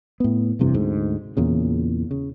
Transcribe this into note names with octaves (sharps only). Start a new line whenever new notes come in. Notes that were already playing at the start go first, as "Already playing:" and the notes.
A2 B3
F1 G2 C3 E3
D2 G#2
E2 A#2 C#3
C#3